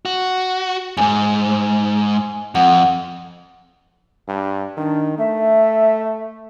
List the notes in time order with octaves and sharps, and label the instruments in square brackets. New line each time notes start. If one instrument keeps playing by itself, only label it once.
[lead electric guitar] F#4
[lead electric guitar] E2 G#2 [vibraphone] G#5
[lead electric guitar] F2 [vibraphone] F#5
[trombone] G2
[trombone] D#3 [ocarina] D4
[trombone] A3 [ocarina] E5